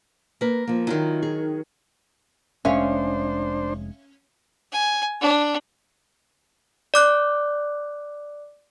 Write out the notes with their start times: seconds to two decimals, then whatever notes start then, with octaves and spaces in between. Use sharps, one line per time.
0.41 A#3 A#4 B4
0.67 F3 A#3
0.87 D#3 F#3 E4 F4
1.22 G#4
2.65 F1 G#3 C#4 D4 C5 E5 F5 G#5
4.72 G#5
5.21 D4
6.94 D5 D6 F#6